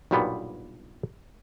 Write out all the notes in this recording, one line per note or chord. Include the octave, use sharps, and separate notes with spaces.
B1 G2 A#2 G3 B3